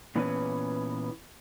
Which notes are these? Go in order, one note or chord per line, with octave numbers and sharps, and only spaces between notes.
A#2 E3 B3 C#4 B4